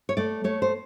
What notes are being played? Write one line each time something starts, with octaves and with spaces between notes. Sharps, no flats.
C#5
A3 D5
A3 C#5
C5